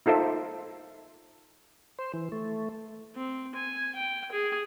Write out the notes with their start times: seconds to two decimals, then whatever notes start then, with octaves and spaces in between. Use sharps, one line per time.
0.06 D#4 F4 A4 C5 E5
1.99 C5
2.13 E3
2.32 A3
3.15 C4
3.55 G#5
3.95 G5
4.32 G#4